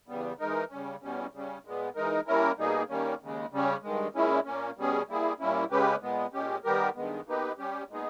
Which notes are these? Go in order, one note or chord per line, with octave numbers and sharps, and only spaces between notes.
E2 C#3 G3 B3
E3 G#3 D#4 A#4
C#3 G3 C#4
E2 B2 G3 C#4
C#3 G3 C#4
A#2 G#3 B3
E3 G#3 D#4 A#4
G3 A#3 C#4 E4 A#4
B2 G3 A#3 D#4 G#4
D#3 G3 A#3 C#4
D#2 C#3 G#3
C#3 G3 C#4
G2 D#3 G#3
A#2 G#3 C#4 E4
A#2 A#3 C#4
B2 G3 C#4 G#4
G3 A#3 E4 G#4
A#2 G3 A#3 C#4 E4
C#3 G#3 C#4 G4 B4
A#2 G#3 B3
A#2 G#3 C#4 G4
D#3 G3 B3 G4 A#4
G2 D#3 G#3 B3
B2 A#3 D#4 G4 B4
G3 C#4 G4
A#2 G#3 B3 D#4 G#4